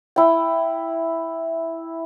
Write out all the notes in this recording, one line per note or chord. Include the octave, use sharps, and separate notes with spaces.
E4 G5